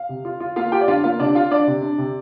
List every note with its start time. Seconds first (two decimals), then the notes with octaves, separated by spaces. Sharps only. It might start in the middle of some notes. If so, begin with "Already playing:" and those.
Already playing: F5
0.09 C3
0.25 F4
0.40 F4
0.56 A#3 F4 F5
0.72 F4 G4 G5
0.81 D5
0.88 D4 F4 F5
1.04 A#3 F4 F5
1.20 C3 D4 D5
1.35 F4 F5
1.51 D4 D5
1.67 C3
1.82 D4
1.98 C3